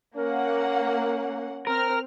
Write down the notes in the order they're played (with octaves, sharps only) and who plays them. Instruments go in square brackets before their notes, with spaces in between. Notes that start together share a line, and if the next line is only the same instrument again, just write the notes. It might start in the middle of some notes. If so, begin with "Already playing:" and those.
[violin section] A#3 F#5 [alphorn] C#4 [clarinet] A#4
[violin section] C4 F6 [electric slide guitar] A#4